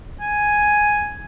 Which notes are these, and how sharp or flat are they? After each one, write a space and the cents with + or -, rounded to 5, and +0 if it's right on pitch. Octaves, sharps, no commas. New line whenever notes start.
G#5 +5